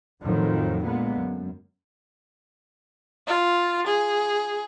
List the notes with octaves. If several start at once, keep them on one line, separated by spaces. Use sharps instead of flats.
F2 A2 D#3 F3 F#3
A#2 D3 G#3 A#3 B3
F#2
F4
G#4